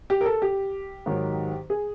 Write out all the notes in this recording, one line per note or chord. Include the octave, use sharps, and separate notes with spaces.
G4
A#4
A4
G4
G#2 D#3 F#3
G#4